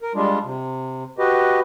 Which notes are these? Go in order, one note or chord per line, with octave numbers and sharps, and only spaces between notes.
A#4
G3 G#3 D4 F4
C3
F#4 G4 B4 D#5